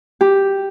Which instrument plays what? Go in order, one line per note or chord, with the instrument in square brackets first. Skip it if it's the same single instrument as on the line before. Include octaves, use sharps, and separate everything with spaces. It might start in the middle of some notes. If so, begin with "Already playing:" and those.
[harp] G4